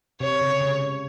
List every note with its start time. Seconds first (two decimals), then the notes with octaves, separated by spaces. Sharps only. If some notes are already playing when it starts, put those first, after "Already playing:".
0.20 C3 C#5
0.41 C#3
0.61 C#3